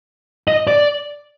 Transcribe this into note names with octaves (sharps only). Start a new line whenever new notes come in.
D#5
D5